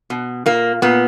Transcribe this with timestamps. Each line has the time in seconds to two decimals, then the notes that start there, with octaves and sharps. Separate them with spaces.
0.10 B2
0.46 A#2 A#3
0.82 A#2 B3